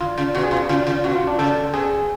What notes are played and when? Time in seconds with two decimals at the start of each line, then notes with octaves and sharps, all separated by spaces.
0.01 D3 F4
0.18 C#3
0.35 B2 F#4
0.43 G#4
0.51 B2 F4
0.69 C#3 F4
0.87 C#3
1.04 B2 F#4
1.16 F4
1.27 D4
1.39 C#3 A4
1.74 B2 G#4